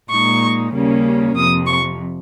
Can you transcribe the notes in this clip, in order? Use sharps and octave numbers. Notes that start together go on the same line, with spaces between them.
A#2 G#3 D#4 C#6
D#2 C#3 G3 A#3 C#4
F2 C3 F3 D#6
C#6